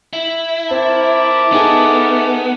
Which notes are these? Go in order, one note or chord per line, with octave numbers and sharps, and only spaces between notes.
E4
C4 A#4 E5 A5 D6
B3 D#4 G#4 A4